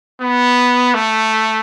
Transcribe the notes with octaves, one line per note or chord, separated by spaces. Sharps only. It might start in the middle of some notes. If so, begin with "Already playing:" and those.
B3
A3